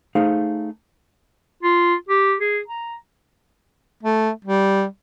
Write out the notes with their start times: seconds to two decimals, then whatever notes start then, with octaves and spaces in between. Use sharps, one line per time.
0.15 A3 D#4 G#4 C5 F5
1.63 F4
2.09 G4
2.40 G#4
2.68 A#5
4.03 A3
4.45 G3